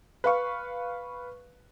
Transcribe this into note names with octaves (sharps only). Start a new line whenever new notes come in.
B4 F5 C#6